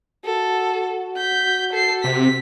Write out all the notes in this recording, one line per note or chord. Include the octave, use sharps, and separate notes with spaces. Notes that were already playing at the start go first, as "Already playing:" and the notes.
F#4 A4
G6 B6
A4 C7
C3 B6